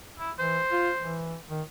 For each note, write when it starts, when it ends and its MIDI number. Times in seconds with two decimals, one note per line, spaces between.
0.19 0.31 64
0.39 0.59 52
0.39 1.22 72
0.72 0.90 65
1.00 1.35 52
1.50 1.62 51